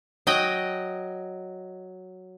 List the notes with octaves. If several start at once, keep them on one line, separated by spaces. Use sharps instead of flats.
F#3 D#5 G5